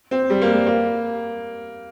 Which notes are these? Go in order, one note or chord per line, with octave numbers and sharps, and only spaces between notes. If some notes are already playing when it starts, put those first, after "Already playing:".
C4
G3
A#3
G3
A#3